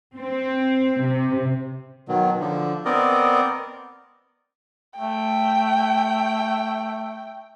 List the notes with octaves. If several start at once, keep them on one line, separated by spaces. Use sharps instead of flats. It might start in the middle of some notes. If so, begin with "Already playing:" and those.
C4
C3
B2 D#3 F#3
D3 F3
B3 C4 A#4 D5 D#5
A3 G5